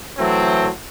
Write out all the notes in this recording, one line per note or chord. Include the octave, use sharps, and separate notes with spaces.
E3 F#3 A3 C4